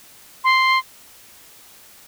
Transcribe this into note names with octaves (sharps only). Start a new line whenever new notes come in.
C6